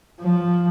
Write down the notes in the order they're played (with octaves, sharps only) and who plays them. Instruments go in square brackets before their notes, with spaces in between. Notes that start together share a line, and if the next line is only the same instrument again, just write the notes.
[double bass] F3